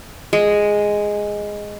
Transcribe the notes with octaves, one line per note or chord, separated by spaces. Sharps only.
G#3